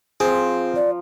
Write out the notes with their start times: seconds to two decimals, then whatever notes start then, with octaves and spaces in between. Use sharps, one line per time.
0.20 F3 C4 G#4 A#5
0.76 D5